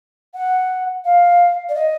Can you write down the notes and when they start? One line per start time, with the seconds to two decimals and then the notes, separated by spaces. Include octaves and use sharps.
0.34 F#5
1.05 F5
1.69 D5
1.74 D#5